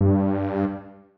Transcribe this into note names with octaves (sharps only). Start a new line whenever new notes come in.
G2